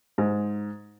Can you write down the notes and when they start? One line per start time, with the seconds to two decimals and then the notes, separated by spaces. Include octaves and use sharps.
0.18 G#2